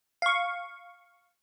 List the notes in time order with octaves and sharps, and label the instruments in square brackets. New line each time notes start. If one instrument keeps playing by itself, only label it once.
[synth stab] F5 C#6